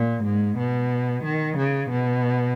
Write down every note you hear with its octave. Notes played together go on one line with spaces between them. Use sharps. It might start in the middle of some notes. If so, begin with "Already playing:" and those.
Already playing: A#2
G#2
B2
D#3
C#3
B2